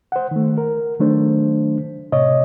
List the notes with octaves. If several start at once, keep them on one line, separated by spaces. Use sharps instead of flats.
C5 F#5
D#3 A3
A#4
D#3 F#3 A3 D4 C5
A2 C3 C#5 D#5